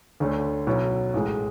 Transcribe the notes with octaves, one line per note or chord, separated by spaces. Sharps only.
D2 D3 A3 C#4
B1 B2 F#3 C#4 E4
A1 A2 G#3